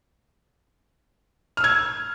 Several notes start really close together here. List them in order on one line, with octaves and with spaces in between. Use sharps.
F6 E6 G#6